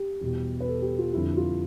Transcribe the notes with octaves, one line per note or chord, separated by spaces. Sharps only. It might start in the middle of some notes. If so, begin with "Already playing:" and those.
Already playing: G4
E2 B2 G3
B4
A4
G4
F4
F2 D3 G3 E4
F4